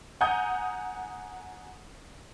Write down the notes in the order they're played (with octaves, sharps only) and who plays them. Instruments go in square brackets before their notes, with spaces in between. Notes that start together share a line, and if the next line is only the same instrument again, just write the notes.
[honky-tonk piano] F#5 G#5 A#5 D#6 G6